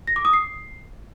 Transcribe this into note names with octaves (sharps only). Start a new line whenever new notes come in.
A#6
D6
D#6
C7